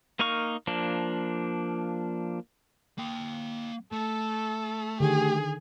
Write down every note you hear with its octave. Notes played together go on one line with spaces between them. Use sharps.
A#3 D#4 A#4 F5 C#6
F3 A#3 D4
A#3 G5
A3 A4
D3 D#3 G4 G#4